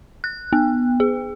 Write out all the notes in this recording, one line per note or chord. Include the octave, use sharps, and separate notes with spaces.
F#6
B3
G#4